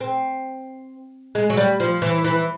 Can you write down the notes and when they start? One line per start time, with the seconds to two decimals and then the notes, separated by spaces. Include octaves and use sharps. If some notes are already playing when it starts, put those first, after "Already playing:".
0.01 C4
1.35 G#3
1.50 F#3
1.57 G3
1.80 F3
2.02 E3
2.24 E3